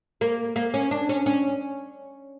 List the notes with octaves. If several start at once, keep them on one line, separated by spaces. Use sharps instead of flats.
A#3
A#3
C#4
D4
C#4
C#4